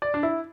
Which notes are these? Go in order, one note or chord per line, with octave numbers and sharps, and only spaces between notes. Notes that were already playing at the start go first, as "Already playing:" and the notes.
D5
D4
E4